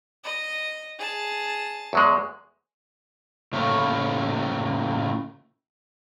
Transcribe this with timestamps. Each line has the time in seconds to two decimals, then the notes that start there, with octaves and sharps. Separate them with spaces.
0.24 D#5
0.99 G#4 A5
1.93 E2 F#3 G#3
3.53 A2 C#3 A3 A#3 C#4